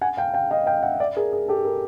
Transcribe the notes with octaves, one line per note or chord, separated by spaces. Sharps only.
F#5 G#5
F5 G5
F5 G5
D#5 F5
F5 G5
E5 F#5
D5 E5
G#4 A#4
G#4
G4 A4
G#4 A#4